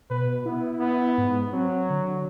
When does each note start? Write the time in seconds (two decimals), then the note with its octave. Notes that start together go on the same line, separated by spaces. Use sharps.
0.10 B2 B4
0.45 B3 E4
0.80 B3
1.18 G#2
1.53 F#3 C4
1.89 D3